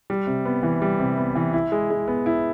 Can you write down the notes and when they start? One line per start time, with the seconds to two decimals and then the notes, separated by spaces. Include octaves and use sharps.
0.10 G3
0.27 C3
0.45 B3
0.63 E3
0.82 G3
0.99 C3
1.17 B3
1.35 E3
1.53 E4
1.72 G#3
1.90 G#3
2.08 B3
2.26 E4